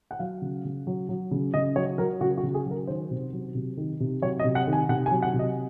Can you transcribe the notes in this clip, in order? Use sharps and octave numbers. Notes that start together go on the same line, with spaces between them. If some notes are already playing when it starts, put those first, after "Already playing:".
F#5
F#3 F5
C#3
C#3
F#3
F#3
C#3
C#3 D#5
F#3 C#5
F#3 A#4
C#3 F#4
F#4
C#3
G#4
F#3 A#4
D#3 C5
C3
F#3
C3
D#3
C3
F#3 C#5
D#5
C3
F#5
D#3
G#5
C3 F#5
G#5
F#3
F#5
C3
D#5